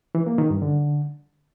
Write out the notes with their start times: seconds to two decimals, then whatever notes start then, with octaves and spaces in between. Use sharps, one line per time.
0.15 E3
0.26 A#3
0.38 D#3
0.50 G2
0.62 D3